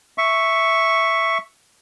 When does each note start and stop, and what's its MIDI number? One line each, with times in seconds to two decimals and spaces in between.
0.18 1.38 76
0.18 1.38 85